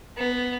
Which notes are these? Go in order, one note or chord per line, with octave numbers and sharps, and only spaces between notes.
B3